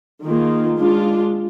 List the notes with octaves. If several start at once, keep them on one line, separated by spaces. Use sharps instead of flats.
D#3 A#3 F4 G#4
G#3 D4 F4